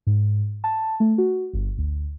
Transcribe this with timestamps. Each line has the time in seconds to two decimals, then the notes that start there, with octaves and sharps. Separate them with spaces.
0.07 G#2
0.64 A5
1.00 A3
1.18 F#4
1.53 G1
1.78 D2